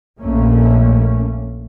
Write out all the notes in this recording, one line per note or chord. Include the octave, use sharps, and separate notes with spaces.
A#1 F2 A3 A#3 C#4